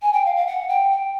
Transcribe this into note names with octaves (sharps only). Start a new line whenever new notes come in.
G#5
G5
F5
F5
F#5
G5
G5